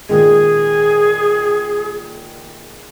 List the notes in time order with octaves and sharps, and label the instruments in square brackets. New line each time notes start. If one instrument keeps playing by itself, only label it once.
[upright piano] A#2 D#3 G#3 [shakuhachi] G#4